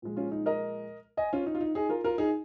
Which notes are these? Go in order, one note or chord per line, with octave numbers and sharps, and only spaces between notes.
A#2 F3 G#3
C#4 F4
D#4
A#4 D#5
D#5 G#5
C#4 F4
D#4
F4
D#4
D#4 G#4
F4 A#4
F4 A#4
D#4 G#4